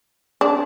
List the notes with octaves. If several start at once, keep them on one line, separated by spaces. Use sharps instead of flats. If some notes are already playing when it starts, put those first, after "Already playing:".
D4